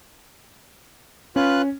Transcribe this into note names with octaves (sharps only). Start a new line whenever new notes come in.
C#4 F4 B4 F#6